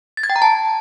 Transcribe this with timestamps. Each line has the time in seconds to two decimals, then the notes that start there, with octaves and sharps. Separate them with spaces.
0.17 A6
0.23 G#6
0.30 G5
0.36 A#5
0.42 A5